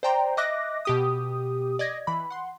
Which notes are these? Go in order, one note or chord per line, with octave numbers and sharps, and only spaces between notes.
C5 D5 G5 A#5 C6
D#5 E5 D6 F#6 A#6
B2 G4 D#6
D5 D#5 G#6 A#6
E3 B5
F#5 C6